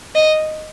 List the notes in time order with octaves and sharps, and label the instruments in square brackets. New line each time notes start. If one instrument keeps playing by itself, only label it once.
[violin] D#5